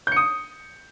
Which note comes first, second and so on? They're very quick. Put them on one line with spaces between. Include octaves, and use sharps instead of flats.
G6 C#7 D#6